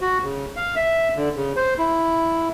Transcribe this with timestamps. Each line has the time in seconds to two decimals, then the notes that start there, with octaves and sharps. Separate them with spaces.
0.01 F#4
0.24 C#3
0.56 F5
0.76 E5
1.16 D3
1.37 C#3
1.56 C5
1.78 E4